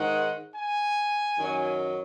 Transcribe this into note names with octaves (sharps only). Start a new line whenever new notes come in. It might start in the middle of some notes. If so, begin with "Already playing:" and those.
Already playing: G#2 D#3 G#3 F#5
G#5
F#2 D#3 F#3